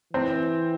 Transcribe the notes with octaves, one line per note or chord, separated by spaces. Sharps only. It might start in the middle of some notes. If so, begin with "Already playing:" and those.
E3 C4